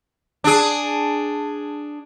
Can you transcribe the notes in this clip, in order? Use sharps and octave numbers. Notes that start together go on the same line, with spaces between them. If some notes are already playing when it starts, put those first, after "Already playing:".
D4 G#4